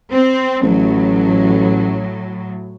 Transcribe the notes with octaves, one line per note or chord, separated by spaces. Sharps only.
C4
A1 A2 F#3